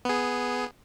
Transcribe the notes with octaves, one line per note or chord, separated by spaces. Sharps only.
B3 G#4